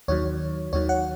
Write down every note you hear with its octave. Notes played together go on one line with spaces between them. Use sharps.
D#2 D#3 F#3 C#5
D#2 D#3 F#3 C#5
F#5